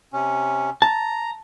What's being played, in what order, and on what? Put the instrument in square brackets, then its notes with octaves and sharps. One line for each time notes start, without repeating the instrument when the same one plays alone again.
[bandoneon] C3 C#4
[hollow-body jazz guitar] A5 [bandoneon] A#5